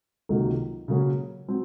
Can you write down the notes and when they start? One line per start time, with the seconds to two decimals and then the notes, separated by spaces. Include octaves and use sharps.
0.29 C#2 C3 D#3 F#3 A#3
0.88 C#3 F#3 A#3 C#4
1.48 F#3 C4